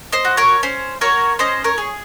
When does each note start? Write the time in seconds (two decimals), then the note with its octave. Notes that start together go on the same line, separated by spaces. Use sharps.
0.12 C5 D#5
0.25 F#4
0.37 A#4 C#5
0.63 C#4 C5
1.01 F#4 A#4 C#5
1.39 C#4 C5 D#5
1.64 A#4 C#5
1.78 G#4